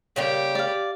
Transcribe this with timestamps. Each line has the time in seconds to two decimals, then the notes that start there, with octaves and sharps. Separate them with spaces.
0.16 C#3 G3 A#3 G4
0.55 D5 F5